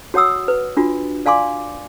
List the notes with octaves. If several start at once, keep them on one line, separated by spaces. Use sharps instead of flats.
F#4 C#5 F#5 D#6 E6
B4
D4 F4 F#4
D5 F5 G#5 C6 D6